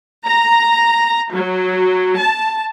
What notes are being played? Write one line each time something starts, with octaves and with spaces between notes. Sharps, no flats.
A#5
F#3
A5